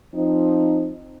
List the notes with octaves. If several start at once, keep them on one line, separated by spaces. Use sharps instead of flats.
F3 C4 D#4